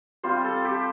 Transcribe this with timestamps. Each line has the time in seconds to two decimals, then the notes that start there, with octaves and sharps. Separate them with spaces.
0.23 G3 C4 F4 C5
0.44 A4
0.65 G4